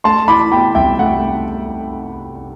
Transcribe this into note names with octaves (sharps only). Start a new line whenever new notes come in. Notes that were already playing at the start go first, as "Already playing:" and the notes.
A3 A5 C6
E4 B5 D6
B2 G5 B5
C2 E5 G5
A3 F#5